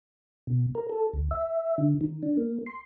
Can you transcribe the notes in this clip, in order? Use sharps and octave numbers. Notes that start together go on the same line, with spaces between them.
B2
A#4
A4
D2
E5
D3
D#3
D4
A#3
C6